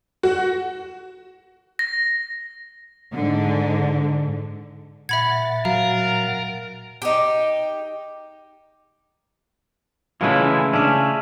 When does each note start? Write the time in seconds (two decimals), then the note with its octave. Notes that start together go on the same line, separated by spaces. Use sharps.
0.23 F#4
1.79 A#6
3.13 G#2 D3
5.09 A#2 E5 F#5 B5 G#6 A6
5.65 F#3 A#4 F5
7.02 D#4 G4
10.21 C#3 E3 G#3 A3 E4 F4
10.73 C#3 C#4 D4 E5